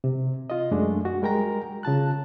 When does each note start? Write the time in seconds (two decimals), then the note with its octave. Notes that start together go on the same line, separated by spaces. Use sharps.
0.04 C3
0.50 F4 D#5
0.71 F#2 G#3 A3 D4
1.05 F#4
1.22 G3 G#3 A#4 G5 A#5
1.83 C#3 F4 A5 F#6